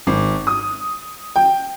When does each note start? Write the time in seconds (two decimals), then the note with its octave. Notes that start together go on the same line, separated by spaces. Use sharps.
0.07 G#1
0.47 D#6
1.36 G5